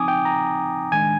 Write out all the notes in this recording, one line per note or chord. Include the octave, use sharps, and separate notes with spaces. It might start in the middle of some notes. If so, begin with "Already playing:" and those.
Already playing: F3 C4 D#4 G#5 D6 D#6
G5
A#5
D#3 G#3 D4 G#5